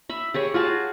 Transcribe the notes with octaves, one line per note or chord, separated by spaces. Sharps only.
E5 B5
G4 G#4 C#5
F4 F#4 G#4 A5